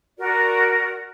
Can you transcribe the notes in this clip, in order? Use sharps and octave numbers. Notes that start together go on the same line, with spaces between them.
F#4 A#4 D5